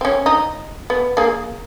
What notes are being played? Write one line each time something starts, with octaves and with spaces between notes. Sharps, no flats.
C4 C#4
D#4
B3
A#3 G#4